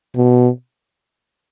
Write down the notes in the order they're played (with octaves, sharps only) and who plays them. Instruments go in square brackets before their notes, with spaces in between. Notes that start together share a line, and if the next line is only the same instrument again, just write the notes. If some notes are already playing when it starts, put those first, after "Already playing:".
[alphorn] B2